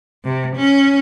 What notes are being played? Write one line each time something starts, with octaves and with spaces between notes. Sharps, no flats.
C3
C#4